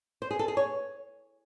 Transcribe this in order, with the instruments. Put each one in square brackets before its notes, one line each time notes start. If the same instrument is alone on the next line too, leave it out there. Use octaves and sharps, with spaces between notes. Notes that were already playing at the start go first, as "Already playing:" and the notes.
[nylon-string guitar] C5
G#4
A4
G#4
C#5